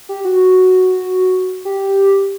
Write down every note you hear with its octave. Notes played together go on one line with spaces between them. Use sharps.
G4
F#4
G4